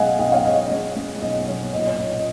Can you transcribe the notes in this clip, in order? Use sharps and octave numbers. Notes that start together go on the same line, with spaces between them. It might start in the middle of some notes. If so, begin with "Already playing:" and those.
Already playing: B1 G#3 D#5 F5 F#5 G#5
B1 D#5 F#5
C#5 F5
G#3 D#5
D#5
G#3 C#5
G#3
B1 D#5
B1 C#5
A#2 D#5
C#5
A#2 D#5
D#5